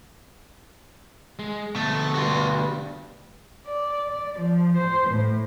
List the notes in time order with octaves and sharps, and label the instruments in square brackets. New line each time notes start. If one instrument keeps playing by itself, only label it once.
[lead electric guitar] G#3
[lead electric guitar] D2 B2 [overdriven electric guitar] A3
[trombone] G2 [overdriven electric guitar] F#4 C6
[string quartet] D5
D5
F3
C5
A2